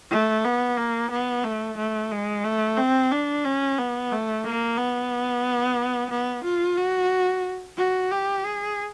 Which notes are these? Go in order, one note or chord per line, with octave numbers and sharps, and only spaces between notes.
A3
B3
A#3
B3
A3
A3
G#3
A3
C4
D4
C#4
B3
A3
A#3
B3
B3
F4
F#4
F#4
G4
G#4